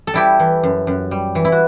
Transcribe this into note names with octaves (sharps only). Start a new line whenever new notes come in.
A4
G3 E4 G4
E3
F#2
F#2
G3
E3
E4
F#4